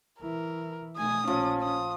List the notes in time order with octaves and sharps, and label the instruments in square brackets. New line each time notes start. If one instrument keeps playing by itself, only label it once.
[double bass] E3 E4 [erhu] A#4
[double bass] B2 A3 [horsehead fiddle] G#5 [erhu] D#6
[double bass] A#1 [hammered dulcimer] F3 [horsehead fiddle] C#4
[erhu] D#6